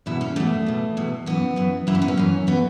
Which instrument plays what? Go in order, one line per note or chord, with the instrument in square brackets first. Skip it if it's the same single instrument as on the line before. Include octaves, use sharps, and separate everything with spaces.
[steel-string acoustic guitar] E2 B2 E4
C#4
E2 B2 A3
E2 B2
E2 B2
F#2 E3 B3
F#2 E3
F#2 E3 E4
C#4
B3
C#4
F#2 E3
A2 E3 B3